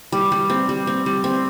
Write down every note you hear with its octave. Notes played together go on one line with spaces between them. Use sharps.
G3
G3
C4
G3
C4
G3
C4